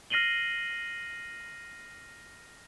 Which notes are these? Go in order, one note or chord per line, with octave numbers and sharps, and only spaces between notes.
F6 A#6 C7 D#7 F#7 G7